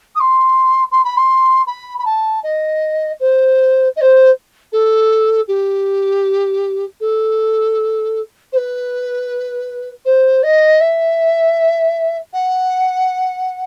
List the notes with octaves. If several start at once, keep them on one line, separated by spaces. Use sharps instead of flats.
D#6
C6
C6
B5
C6
B5
B5
A5
D#5
C5
D#5
C5
A4
G4
A4
C5
B4
C5
D#5
E5
F#5